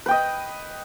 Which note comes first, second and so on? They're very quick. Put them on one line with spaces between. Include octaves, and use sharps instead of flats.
B4 G5 D#5